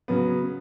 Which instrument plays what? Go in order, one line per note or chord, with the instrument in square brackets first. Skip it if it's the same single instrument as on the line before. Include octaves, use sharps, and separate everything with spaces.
[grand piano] C#3 F#3 B3